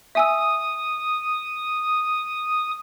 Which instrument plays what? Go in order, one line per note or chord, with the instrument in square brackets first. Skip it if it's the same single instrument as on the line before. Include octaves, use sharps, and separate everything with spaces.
[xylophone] E5 G#5 E6 [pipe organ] D#6